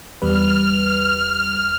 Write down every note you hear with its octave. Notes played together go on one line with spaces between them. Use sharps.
E2 G3 B4 F6